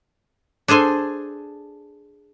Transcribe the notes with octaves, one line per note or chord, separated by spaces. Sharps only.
D4 G#4 A4 C5 G#5